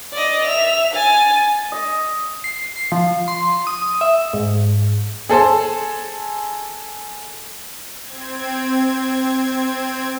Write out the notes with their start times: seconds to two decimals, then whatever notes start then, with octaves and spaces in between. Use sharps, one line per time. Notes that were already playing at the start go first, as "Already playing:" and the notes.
0.13 D5 D#5
0.44 E5 F7
0.93 G#5 A6
1.72 D#5
2.44 C7
2.76 C7
2.92 F3
3.28 C6
3.67 D#6
4.01 E5
4.33 G#2
5.29 G#4 A4 C5 A5
8.02 C4 G#6